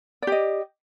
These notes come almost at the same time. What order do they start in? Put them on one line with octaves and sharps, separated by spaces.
D5 G4 D#5